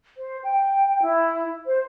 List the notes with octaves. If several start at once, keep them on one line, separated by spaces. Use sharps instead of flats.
C5
G5
E4
C5